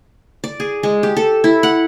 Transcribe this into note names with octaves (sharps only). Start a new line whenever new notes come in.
D5
G#4
G#3
G4
A4
E4
F#5